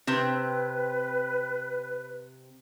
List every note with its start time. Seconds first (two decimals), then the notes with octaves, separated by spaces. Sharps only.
0.07 C3 C4 B4 E5